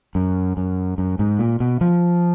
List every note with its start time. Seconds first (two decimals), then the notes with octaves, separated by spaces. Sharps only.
0.15 F#2
0.57 F#2
0.98 F#2
1.19 G#2
1.39 A#2
1.60 B2
1.81 F3